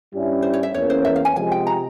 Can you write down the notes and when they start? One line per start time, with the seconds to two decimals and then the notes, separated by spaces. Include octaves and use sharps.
0.13 G2 G3 C#4 E4
0.42 C5
0.53 C#5
0.63 E5
0.74 E2 E3 A#3 C#4 C#5
0.90 C5
1.05 E5
1.16 F5
1.25 G#5
1.35 C3 F3 G#3 G#5
1.52 G5
1.67 A#5